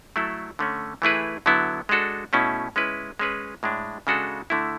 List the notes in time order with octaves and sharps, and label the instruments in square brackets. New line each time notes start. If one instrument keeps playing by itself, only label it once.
[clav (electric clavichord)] F#3 A3 E4 A4
D3 A3 C#4
E3 A3 E4 G#4 B4
D3 F#3 B3 E4
G#3 D4 F#4 A4
B2 A3 C#4 E4
G#3 C#4 E4 B4
G#3 C#4 G#4 B4
A2 G#3 D4
C#3 G#3 D4 F#4 A4
D3 A3 E4